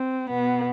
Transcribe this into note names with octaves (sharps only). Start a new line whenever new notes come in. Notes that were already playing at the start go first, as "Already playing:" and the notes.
Already playing: C4
B2 B3